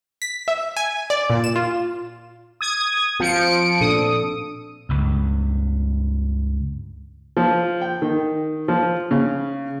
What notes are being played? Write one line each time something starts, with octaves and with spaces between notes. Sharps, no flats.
B6
E5
G#5
D5
A#2
E7
F4
D#6 G#6
F3 C4 C#7 D7
A#2 D4 A4 D#6
C#2 G2
F3
G5
D#3
F3
C#3